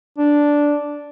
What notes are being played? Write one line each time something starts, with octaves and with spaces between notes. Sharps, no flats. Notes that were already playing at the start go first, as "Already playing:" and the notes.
D4